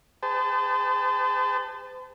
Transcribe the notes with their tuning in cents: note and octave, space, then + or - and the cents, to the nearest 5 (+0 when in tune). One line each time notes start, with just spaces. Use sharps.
G#4 -35 C5 -45 A5 +0